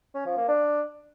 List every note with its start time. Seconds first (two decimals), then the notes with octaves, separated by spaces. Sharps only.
0.14 C#4
0.26 F3
0.37 A#3
0.48 D4